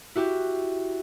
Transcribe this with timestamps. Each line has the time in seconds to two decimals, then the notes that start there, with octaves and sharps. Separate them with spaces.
0.16 E4 F#4 G4